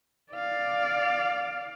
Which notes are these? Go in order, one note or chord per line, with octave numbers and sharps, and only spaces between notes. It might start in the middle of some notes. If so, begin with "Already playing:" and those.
D5 F5